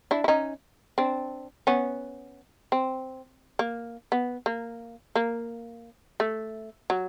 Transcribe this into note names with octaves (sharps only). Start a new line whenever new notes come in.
D4 E4
E4
C#4 D#4
C4 D4
B3 C#4
C4
A#3
B3
A#3
A#3
A3
F#3